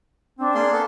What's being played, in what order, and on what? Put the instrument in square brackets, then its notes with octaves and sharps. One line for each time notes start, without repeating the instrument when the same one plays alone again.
[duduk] C4 [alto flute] D4
[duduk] A#3 [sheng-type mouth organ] G#4 D5 C6
[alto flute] B3 [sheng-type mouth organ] A4